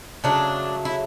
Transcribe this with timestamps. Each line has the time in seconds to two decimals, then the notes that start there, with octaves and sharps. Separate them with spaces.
0.24 C#3 F#3 A3 D4
0.85 E4